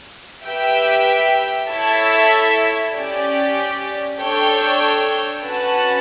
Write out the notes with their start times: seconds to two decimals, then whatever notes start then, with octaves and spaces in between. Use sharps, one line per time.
0.45 G4 B4 E5 G5
1.69 E4 A4 C#5 E5 A5
2.94 C#4 G4 D5
4.19 D4 A4 C#5 G5
5.44 C#4 F#4 B4 F#5 A5